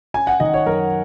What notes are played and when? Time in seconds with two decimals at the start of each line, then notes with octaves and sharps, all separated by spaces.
0.14 C#4 G#5
0.27 F#5
0.40 D#3 D#5
0.54 C#5
0.66 F#2 A#4